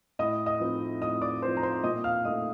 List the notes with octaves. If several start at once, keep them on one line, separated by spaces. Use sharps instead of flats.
A2 D#5 D#6
D#5 D#6
F3 C4 D#4
A2 D#5 D#6
D5 D6
F3 C4 D#4 C5 C6
A#5
C5 C6
A#2 D#5 D#6
F5 F6
A3 D#4 D#5 D#6